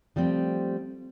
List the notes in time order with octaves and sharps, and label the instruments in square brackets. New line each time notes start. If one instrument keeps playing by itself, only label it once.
[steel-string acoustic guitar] F3 G3 A3 C4